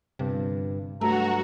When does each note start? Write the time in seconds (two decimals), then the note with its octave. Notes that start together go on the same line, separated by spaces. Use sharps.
0.19 G1 G2 C3
1.01 G2 F#3 A3 F#4 A#5